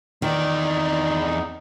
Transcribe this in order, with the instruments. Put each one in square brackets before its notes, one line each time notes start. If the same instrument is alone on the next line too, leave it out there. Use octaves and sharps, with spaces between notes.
[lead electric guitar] E2 D5 [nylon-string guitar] D#3 [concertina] D#4